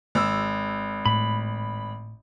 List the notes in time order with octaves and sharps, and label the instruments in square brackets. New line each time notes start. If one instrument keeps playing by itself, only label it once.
[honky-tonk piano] G#1 E6
[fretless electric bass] A2 [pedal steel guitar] B5